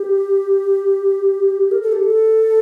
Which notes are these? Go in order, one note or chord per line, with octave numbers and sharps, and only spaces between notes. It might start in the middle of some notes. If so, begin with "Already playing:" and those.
Already playing: G4
A#4
A4
G4
A4